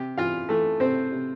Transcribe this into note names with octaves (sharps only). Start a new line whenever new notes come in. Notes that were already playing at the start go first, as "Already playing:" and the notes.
Already playing: C3 G4
E3 F4 F5
E3 A3 A4
C3 C4 C5
C3